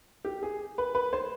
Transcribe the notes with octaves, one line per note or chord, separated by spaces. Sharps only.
G4
G#4
B4
B4
C5